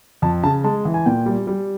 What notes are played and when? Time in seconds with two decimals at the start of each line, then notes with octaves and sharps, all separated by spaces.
0.22 F2 A5
0.44 C#3 A5
0.64 G#3 A5
0.85 E3
0.94 G#5
1.06 A#2 G5
1.26 G3
1.47 G3